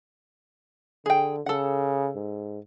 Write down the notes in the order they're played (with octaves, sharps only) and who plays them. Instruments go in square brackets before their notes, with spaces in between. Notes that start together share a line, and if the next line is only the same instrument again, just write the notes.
[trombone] D3 [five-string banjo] G#4 G5
[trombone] C#3 [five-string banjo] A4 F#5
[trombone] G#2